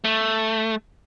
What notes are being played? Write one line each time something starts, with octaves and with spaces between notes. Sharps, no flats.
A3